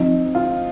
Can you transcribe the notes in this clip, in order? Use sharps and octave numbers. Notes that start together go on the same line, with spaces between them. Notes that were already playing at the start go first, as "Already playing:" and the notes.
Already playing: F3 C4 D#4
F4